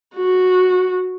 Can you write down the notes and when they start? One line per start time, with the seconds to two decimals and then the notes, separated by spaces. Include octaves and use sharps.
0.16 F#4